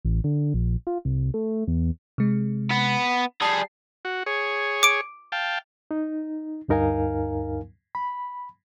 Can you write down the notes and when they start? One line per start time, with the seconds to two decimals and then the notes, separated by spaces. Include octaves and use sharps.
0.05 A1
0.24 D3
0.54 A#1
0.87 F4
1.05 C2
1.34 A3
1.67 E2
2.18 C3 G#3
2.71 B3
3.42 G3 G#4 A5 C7
4.05 F#4
4.26 G#4 C#5
4.83 D6 D7
5.32 F5 G5 A5
5.91 D#4
6.68 D2 G2 D#4 A#4 F5 G#5
7.95 B5